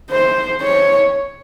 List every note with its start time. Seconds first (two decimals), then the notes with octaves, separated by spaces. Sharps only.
0.10 C5
0.62 C#5